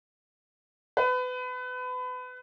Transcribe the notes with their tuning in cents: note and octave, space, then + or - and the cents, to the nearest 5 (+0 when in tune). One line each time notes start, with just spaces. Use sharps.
B4 +30